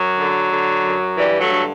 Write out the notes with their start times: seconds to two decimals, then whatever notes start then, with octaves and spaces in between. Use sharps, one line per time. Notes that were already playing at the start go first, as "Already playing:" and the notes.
Already playing: F#2 F#3
0.18 D3
0.52 D3
0.85 F#2
1.17 G2 E3 G3
1.39 F#3 A3
1.51 D3